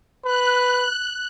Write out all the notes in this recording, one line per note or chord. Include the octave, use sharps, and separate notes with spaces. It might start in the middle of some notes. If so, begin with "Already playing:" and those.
B4 F#6